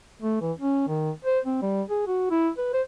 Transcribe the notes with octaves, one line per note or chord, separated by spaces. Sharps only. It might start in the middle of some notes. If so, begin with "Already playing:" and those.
A3
E3
C#4
D#3
C5
C4
G3
G#4
F#4
E4
B4
C5